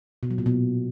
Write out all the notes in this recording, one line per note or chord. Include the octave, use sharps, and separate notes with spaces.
B2
F#3
A#2
B2